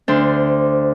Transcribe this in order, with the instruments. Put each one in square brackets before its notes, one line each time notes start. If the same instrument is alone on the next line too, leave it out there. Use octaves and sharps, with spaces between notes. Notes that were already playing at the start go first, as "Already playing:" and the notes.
[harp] D2 D4 C5 D5